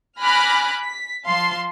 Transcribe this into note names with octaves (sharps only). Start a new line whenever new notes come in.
G#5 B5 D6 F6 F#6 A#6
B6
F3 F5 A5 C6